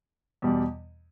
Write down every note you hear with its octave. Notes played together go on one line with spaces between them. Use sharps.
E2 B2 G3